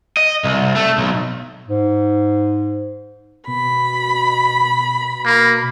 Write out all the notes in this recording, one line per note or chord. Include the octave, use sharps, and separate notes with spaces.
D#5
C2
A3
B1
G#2
B2 B5
A#3